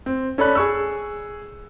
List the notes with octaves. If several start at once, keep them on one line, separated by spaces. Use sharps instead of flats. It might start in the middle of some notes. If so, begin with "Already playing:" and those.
C4
C#4 A4 D5 B5 F#6
G#4 C#6 E6